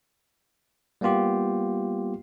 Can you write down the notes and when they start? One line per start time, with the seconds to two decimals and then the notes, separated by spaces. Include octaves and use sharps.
1.01 G3 A#3 B3 F4 G4